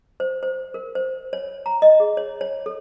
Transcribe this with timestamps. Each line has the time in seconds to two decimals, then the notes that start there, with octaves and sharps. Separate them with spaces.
0.20 C5
0.43 C5
0.74 A#4
0.95 C5
1.33 C#5
1.66 A#5
1.82 D#5
2.00 G#4
2.17 C#5
2.41 C#5
2.66 A4